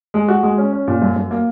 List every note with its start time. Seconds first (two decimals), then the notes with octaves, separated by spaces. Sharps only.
0.14 G#3
0.28 F#4
0.43 G#3
0.58 C#4
0.73 C#4
0.88 A#2
1.02 F#2
1.16 F#2
1.31 A#3